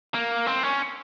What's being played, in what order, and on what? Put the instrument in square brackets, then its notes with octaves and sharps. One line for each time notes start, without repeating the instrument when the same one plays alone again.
[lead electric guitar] A#3
C4
C#4